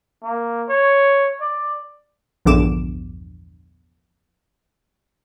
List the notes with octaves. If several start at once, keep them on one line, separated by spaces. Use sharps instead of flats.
A#3
C#5
D5
A#1 E2 G2 D3 D6 E7